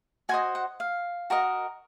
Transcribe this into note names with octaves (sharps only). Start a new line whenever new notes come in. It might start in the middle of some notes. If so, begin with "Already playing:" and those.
F#4 C5 D#5 G#5
F#5
F5
F#4 A#4 D#5